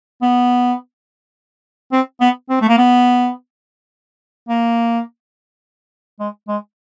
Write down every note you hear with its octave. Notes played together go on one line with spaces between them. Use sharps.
B3
C4
B3
C4
A3
A#3
B3
A#3
G#3
G#3